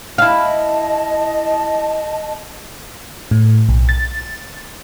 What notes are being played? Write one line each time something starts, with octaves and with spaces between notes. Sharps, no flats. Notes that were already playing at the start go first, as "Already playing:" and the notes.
E4 D#5 F5 A5
A2
B1
A6